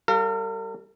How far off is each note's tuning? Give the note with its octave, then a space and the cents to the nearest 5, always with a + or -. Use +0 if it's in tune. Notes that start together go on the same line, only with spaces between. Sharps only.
G3 +0 A#4 -45 F5 +0